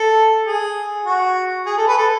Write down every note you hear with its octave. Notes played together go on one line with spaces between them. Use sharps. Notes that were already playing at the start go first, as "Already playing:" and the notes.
Already playing: A4
G#4
F#4
G#4
A4
B4
A4